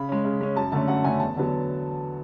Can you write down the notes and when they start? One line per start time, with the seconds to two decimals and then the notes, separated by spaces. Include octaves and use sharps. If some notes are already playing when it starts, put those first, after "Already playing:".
Already playing: C#3 B5
0.09 G#3 C#4
0.25 C#3
0.41 G#3 C#4
0.56 F#2 A5
0.72 D3 A3 C#4 A5
0.88 F#2 F#5
1.04 D3 A3 C#4 G#5
1.20 E2 A5
1.37 D3 F#3 B3